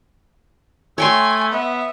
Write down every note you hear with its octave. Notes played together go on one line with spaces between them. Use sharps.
A3 C#5 G5 G#5 C6
B3 E5